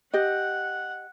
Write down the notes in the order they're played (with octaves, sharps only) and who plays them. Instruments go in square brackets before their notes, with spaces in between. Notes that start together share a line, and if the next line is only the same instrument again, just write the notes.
[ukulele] G4 D#5 [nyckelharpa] F#5